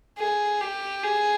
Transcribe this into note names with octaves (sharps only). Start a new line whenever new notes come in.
G#4
G4
G#4